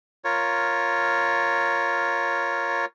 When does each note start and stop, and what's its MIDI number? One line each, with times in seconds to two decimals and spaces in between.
0.25 2.85 65
0.25 2.85 70
0.25 2.85 73